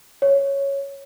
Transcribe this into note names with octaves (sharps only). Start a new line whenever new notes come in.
C#5